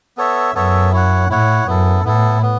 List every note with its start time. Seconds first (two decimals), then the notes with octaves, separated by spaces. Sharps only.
0.17 B3 A4 C#5 E5
0.54 F#2 B3 A4 C#5 E5
0.93 E4 C#5 F#5
1.30 A2 E4 C#5 F#5
1.67 F#2 B3 E4 A4
2.04 A2 B3 E4 A4
2.42 B3